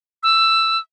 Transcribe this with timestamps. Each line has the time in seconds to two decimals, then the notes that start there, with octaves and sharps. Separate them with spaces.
0.23 E6